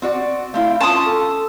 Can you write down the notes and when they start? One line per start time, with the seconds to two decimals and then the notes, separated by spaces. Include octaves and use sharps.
0.02 C4 F#4 D5
0.54 A3 C4 E4 F5
0.81 C#4 F4 A5 C6 D#6
1.05 A4